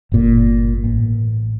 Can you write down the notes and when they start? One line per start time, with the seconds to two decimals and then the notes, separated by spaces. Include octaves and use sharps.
0.12 G1 A#2
0.84 A1